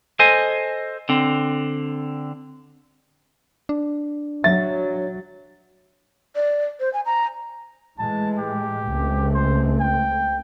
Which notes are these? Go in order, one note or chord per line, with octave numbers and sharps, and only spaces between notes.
A4 C5 D#5 G#5
D3 C4
D4
F#3 E5 A6
D5
C5
G#5
A#5
A2 E3 G#3 A5
G4
C#2 A3 C4
C5
G5